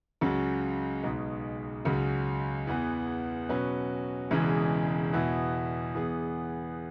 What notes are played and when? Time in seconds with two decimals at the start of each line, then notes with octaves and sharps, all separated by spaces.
0.21 C#2 C#3 F#3
1.03 B1 B2 G#3
1.85 C#2 C#3 F#3
2.67 E2 E3 B3
3.49 B2 F#3 C#4 F#4 B4
4.31 E1 E2 C#3 E3 G#3
5.12 E2 B2 B3 E4
5.95 E2 E3 B3 G#4